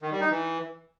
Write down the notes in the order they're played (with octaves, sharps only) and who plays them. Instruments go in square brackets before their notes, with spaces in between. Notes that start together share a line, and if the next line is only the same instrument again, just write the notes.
[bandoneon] D#3
G3
D#4
E3